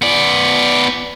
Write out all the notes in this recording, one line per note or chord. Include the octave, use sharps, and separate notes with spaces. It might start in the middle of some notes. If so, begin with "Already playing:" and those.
B3 D5